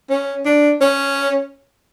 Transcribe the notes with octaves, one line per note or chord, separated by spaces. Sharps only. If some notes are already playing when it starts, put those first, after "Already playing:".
C#4
D4
C#4